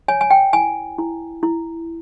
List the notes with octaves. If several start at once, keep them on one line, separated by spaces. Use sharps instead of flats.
C#5 G#5
G#5
G5
E4 G#5
E4
E4